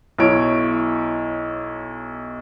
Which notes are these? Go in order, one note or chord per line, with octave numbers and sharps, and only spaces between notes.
B1 E4 C#5 D7